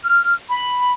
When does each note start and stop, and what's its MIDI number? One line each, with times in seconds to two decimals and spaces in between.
0.04 0.34 89
0.50 0.91 83